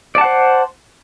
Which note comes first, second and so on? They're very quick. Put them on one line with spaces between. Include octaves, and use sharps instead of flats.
D5 A5 F#5 C5